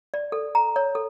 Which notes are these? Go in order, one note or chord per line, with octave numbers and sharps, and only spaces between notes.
D5
A4
A#5
C#5
A4